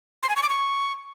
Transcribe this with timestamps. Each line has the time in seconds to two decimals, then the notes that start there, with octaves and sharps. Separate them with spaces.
0.23 C6
0.29 G#5
0.36 C#6
0.43 D6
0.49 C#6